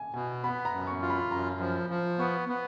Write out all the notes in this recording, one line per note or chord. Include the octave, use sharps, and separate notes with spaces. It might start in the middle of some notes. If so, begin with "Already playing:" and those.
Already playing: G#5
B2 G#5
B3 B5
A#5
F#2
C#6
F4
B5
F#2 A#5
F3
F3
B3 C#6
B3